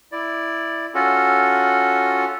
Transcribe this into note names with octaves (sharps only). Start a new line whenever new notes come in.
E4 D5
C#4 F4 F#4 A4